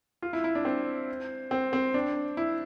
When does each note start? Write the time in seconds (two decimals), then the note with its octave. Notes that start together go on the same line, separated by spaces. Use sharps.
0.22 F4
0.33 E4
0.44 E4
0.55 D4
0.65 C4
1.51 C4
1.73 C4
1.94 D4
2.37 E4